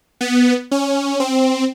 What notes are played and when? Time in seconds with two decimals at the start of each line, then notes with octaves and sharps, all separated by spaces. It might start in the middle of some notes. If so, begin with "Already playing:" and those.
0.21 B3
0.71 C#4
1.20 C4